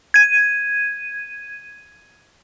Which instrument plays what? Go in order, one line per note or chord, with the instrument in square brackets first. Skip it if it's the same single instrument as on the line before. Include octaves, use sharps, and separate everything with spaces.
[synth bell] G#6 D#7